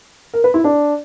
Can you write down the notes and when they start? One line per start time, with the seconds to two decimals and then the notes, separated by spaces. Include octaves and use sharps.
0.33 A#4
0.44 B4
0.54 E4
0.64 D4